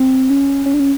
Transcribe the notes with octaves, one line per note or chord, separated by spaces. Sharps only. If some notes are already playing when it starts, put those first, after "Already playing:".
Already playing: C4
C#4
C#4
D4
C#4